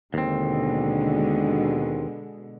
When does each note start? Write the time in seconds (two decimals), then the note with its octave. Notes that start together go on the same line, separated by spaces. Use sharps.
0.14 D#2 B2 D3 G#3 C4